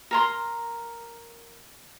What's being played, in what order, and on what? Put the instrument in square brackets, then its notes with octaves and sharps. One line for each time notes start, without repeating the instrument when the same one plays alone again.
[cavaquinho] A#4 A#5 C6